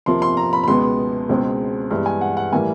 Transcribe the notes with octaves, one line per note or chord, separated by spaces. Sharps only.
F2 C3 F3 A#3 C6
C6
A#5
B5
B5
C#2 B2 G#3 B3 C6
C#2 B2 G#3 C4
G2 E3 G#3 B3
G#5
F#5
F#5
A2 E3 G3 A#3 G#5